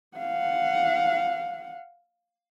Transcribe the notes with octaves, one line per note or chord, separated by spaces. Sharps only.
F5 F#5